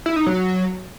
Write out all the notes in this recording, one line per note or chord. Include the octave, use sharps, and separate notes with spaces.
E4
D#4
F#3